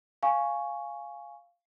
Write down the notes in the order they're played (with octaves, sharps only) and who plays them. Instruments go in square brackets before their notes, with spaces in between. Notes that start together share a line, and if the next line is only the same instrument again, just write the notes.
[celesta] F5 G#5 C#6